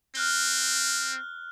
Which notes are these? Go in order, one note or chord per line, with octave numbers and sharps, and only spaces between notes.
C4 F6 F#6 G7